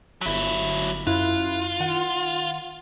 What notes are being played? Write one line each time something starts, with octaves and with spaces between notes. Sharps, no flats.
G1 F#3 E4 B6
F#2 E4 F4 F#6
D#3 F#5